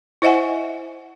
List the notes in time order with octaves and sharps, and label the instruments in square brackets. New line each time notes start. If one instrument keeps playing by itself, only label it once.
[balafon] E4 C5 D#5 E5 F#5 G#5